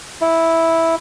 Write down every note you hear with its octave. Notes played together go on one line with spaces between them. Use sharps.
E4